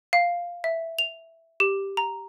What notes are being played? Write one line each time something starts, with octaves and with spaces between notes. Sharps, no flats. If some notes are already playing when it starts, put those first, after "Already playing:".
F5
E5
F7
G4
A#5